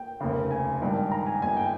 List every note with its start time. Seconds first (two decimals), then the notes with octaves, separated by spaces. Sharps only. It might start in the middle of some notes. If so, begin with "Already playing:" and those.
Already playing: G5
0.20 F1 D#2 C#3
0.51 G#5
0.81 G#1 G2 D#3
1.11 A#5
1.26 G#5
1.42 G1 G2 D#3 G#5
1.57 G5